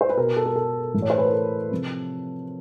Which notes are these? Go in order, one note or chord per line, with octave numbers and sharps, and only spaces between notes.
C5
B4
B2 A#4
A4
A#4
A4
A2 E3
C#5
C5
B4
A#4
A4
C3 F3